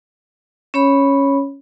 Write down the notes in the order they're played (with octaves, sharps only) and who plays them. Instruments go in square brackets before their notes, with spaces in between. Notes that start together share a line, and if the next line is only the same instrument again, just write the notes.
[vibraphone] C#4 C#5 B5